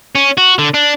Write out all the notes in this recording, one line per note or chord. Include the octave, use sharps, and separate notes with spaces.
C#4
F#4
D3
D4